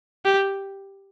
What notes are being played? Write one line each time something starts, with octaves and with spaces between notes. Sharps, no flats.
G4